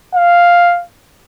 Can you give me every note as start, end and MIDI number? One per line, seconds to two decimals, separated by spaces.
0.15 0.82 77